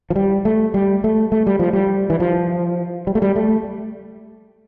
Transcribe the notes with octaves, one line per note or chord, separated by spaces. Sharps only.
F3
G3
A3
G3
A3
A3
G3
F3
G3
E3
F3
G3
A3
G3
A3